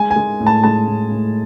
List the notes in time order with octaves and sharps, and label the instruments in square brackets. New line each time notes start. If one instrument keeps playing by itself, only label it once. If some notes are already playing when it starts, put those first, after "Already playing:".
Already playing: [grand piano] G#3 G#5
G#5
G#3
A2
A5
G#3 A5
A2
A2